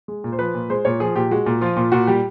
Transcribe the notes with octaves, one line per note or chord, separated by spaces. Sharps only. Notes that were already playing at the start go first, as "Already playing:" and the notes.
G#3
A#2
C5
F3 B4
A#2
G#3 C5
A#2 C#5
F3 G#4
A#2 G4
G#3 F#4
A#2
F3 F4
A#2
A#2 F#4
G3 G4